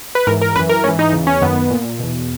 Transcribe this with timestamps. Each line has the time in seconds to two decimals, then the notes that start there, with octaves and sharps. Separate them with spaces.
0.15 B4
0.27 G#2 E3 A#4
0.41 A#4
0.56 F#2 E3 B4
0.69 A#4
0.84 G#2 E3 C#4
0.99 D#4
1.13 E2 C#3 E3
1.27 C#4
1.41 F#2 D#3 B3
1.70 A#2
2.00 E2 B2